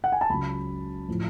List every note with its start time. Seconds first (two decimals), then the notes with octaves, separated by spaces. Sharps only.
0.04 F#5
0.12 G#5
0.21 A5
0.30 C#2 C#3 F#3 B5
1.08 A2 F3